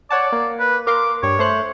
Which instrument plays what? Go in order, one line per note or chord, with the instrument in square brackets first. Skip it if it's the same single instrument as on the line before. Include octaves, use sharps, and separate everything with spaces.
[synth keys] C#5 F#5 A5 [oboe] D5
[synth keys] A#3
[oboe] B4
[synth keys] A#4 F5 C6 [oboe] D6
[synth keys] G2 [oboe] C#5
[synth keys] A3 C5 F#6